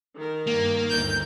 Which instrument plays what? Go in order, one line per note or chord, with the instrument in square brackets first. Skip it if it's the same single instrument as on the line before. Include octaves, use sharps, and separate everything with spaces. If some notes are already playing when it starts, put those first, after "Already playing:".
[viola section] D#3 A#4
[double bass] G2 [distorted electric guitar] A#3
[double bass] G1 D2 [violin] G6